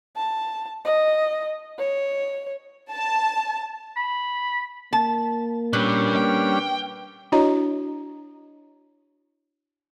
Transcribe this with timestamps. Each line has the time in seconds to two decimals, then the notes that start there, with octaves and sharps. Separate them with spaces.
0.16 A5
0.85 D#5
1.79 C#5
2.91 A5
3.96 B5
4.93 A#3 A5
5.73 A#2 G3 C#4 D4 B4
6.16 G5
7.32 D4 E4 F#4 C#5 D#5 A#5